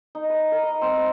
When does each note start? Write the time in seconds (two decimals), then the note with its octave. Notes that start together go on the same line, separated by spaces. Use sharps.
0.15 D#4
0.30 B4
0.52 A#4
0.63 D#5
0.82 C4
0.98 C5